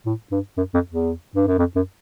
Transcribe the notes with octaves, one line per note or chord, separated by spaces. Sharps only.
A2
G2
F#2
F2
E2
G2
F#2
F2
F#2